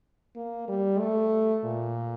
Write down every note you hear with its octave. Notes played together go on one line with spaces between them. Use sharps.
A#3
G3
A3
A#2